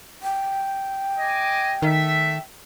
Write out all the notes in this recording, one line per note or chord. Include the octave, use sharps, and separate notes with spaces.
G5
D#5 G#5 D6
D#3 A3 E5